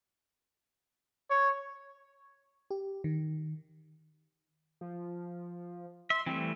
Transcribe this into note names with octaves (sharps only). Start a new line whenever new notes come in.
C#5
G4
D#3
F3
E5 C6
E3 G3 A3 C4